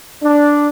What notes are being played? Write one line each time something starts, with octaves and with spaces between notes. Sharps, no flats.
D4